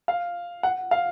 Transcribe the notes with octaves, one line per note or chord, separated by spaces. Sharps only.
F5
F#5
F5